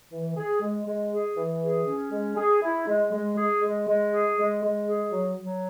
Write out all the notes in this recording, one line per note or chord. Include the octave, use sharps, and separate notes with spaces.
E3
G#4
G#3
G#3
G#4
E3
G#4
C#4
G#3
G#4
E4
G#3
G#3
G#4
G#3
G#3
G#4
G#3
G#3
G#4
F#3
F#3